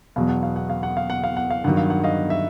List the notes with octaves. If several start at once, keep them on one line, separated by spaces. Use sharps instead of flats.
E2 B2 F#3 F5
F#5
F5
F#5
F5
F#5
F5
F#5
F5
F#5
F5
G2 D#3 F#3 F#5
F5
F#5
D#5 F5
E5